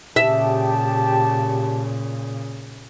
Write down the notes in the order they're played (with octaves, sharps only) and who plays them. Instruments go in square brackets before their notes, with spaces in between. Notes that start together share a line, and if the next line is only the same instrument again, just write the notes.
[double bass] A#2 C#3 [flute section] G4 A5 [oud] E5